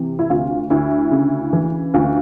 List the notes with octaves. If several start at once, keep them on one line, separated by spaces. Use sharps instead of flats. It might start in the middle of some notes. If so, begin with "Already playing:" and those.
Already playing: C3 E3
E4
D2 F4
D2 E4
C#3
E3
D2 F4